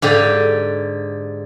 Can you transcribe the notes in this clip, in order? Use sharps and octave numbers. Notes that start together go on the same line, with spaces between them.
G#2 D3 G4